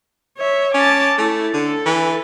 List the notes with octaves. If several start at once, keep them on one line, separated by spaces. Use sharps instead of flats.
C#5 E5
C#4 A5 D6
A3 E4
D3 A4
E3